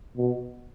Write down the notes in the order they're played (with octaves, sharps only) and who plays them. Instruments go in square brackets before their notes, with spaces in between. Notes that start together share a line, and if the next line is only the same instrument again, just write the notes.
[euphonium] B2